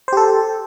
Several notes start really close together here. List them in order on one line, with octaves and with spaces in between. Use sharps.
C5 G4 A4